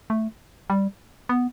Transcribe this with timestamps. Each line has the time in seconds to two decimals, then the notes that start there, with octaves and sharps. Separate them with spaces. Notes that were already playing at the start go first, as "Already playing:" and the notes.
0.10 A3
0.70 G3
1.29 B3